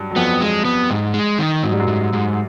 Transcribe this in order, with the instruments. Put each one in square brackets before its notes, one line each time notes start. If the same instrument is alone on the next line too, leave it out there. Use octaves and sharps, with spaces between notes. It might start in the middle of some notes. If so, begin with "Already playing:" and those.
Already playing: [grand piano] G2 F#3 G3
F#3
[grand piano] F2 F3 [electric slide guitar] B3
[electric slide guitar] G#3
B3
G#2
G#3
D#3
[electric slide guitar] G#2 [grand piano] F#3
[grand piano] G3
F#2 F#3
[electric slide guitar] G#2
G#2